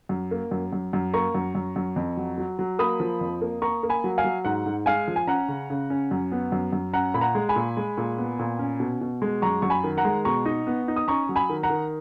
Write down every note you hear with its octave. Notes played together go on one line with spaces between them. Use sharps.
F#2
A#3
F#2
F#2
F#2
A#3 A#5 C#6
F#2
F#2
F#2
F2
F#3
F#3
F#3
A#3 B5 D#6
F3
F2
A#3
A#3 A#5 C#6
A#3
G#5 B5
F#3
F5 G#5
F#3
G#2 F#5
G#2
G#3 F5 G#5
F3
G#5
C#4 F#5 A#5
C#3
C#3
C#4
F#2
B3
F#2
F#2
C#4 F#5 A#5
A#2 B5
F#5 A#5
G#3
G#5 B5
A#2
G#3
A#2
B3
A#2
C#4
B2
B2
G#3
F#2 A#5 C#6
F#2 C#6
G#5 B5
D#3
F#5 A#5
G#3
B2 A#5 C#6
D#4
B3
D#4
D#6
C#4 A#5 C#6
F#3
G#5 B5
D#3
F#5 A#5
D#3